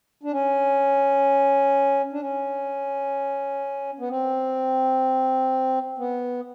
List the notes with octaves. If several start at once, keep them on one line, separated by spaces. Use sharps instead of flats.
D4
C#4
D4
C#4
B3
C4
B3